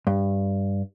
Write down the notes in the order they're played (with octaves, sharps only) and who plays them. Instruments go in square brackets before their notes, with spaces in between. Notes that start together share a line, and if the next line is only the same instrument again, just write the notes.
[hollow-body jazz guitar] G2